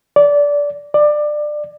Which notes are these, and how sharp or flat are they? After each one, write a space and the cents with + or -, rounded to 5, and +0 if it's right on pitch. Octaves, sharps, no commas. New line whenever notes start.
D5 -20
D5 +20